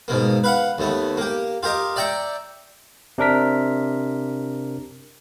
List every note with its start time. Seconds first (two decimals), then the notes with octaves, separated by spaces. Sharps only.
0.08 G#2 B2 A#3
0.44 B4 F5 F#5
0.78 D#2 A3 B3
1.17 A#3 G4
1.63 F4 G4 A#4 D#5
1.96 D5 E5 G5 A#5 C#6
3.18 C3 D4 A#4 B6